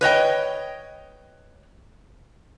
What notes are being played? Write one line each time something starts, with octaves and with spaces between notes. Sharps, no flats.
B4 C#5 D#5 G5